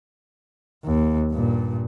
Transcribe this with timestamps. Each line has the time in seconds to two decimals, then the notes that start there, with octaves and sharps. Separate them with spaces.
0.85 D#2
1.31 G2 A#2